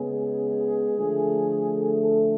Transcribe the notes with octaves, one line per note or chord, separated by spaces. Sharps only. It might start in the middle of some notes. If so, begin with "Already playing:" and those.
Already playing: C#3 G#3 B3 G#4
D3 F3 A3
A4